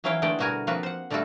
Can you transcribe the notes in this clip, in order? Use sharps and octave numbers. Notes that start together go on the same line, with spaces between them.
E3 F#3 C#4 E4 F5 G5
D3 G#3 A3 B3 D5 G5
B2 G3 F#4 A#4 G#5
F3 A#3 C4 F4 F#4 B4
C5 F#5
D3 G3 A3 F4 F#4 A4